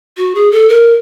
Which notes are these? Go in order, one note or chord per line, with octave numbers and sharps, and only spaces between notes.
F#4
G#4
A4
A#4